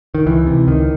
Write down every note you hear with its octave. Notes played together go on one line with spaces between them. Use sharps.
D#3
C#2 E3
C3
C#2 D#3